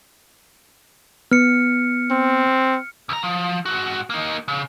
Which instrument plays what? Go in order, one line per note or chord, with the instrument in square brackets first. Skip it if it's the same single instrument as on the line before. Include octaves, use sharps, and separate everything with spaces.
[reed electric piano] B3 [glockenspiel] F6 C#7
[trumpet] C4
[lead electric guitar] C#2 A#5
F3
G#2 F#4
A#3 D#4
C#3